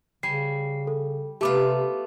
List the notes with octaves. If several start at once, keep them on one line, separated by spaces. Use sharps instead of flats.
C#3 G3 G#5 C7
A4
C3 A3 B3 F4 G4 D6